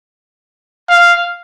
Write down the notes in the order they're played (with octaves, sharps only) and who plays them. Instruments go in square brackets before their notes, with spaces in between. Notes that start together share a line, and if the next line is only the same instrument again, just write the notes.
[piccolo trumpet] F5